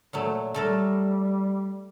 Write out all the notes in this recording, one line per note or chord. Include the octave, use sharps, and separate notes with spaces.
A#2 F#3 A3
G3 A3 A4 A#4